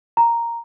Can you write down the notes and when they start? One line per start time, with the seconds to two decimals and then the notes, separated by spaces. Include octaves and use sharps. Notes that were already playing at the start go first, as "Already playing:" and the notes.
0.17 A#5